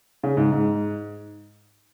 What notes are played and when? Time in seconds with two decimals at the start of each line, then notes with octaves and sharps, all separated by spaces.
0.23 C#3
0.37 G#2
0.52 G#2